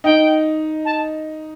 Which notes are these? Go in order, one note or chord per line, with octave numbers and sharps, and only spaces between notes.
D#4 G5
A5